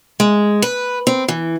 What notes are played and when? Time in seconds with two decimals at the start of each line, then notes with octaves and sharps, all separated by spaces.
0.20 G#3
0.62 B4
1.07 C4
1.28 E3